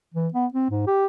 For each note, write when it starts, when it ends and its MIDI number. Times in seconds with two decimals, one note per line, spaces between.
0.15 0.28 52
0.33 0.46 59
0.54 0.67 60
0.71 0.83 44
0.87 1.07 67